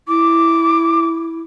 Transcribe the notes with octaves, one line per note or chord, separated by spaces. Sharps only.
E4 D6